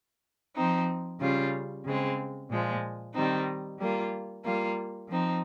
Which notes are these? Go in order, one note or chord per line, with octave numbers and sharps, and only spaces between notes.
F3 C4 D#4
C#3 G3 C#4 F4
C#3 G#3 C4
A#2 F3 G#3
D#3 G3 C4 D#4
G3 A#3 F4
G3 A#3 F4
F3 C4 D#4